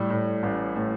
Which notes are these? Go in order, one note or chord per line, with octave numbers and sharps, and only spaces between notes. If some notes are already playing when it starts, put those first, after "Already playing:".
Already playing: A2 G3
A2
A1
A2